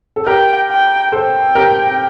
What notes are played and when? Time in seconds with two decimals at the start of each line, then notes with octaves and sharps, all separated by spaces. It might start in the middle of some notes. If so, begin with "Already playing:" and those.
0.16 A4
0.26 G4 A#4 G5
0.69 G5
1.12 A4 C5 G5
1.55 G4 A#4